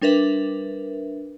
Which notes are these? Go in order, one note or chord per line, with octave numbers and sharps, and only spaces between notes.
G3 D4 A#4 B4 E5